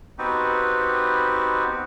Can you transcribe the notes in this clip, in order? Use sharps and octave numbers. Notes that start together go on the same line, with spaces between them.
B3 C4 D#4 F#4 G4 B4